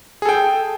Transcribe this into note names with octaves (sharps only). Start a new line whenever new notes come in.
G#4 A4 G5